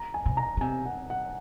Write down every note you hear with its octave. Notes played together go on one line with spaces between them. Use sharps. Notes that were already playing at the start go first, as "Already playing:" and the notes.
Already playing: A#5
G#5
C3
A#5
C#3
C3 G#5
F#5
F#5